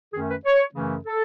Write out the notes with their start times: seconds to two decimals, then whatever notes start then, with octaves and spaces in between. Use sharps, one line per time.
0.13 F#2 D#3 A3 C#4 G#4
0.29 B4
0.44 C#5
0.75 F#2 C#3 E3 A3 C#4
1.05 A4